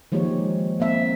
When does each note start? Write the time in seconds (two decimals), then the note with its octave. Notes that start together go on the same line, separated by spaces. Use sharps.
0.12 D#3 F3 G#3 A#3 G4 C#5
0.80 A#3 C4 E5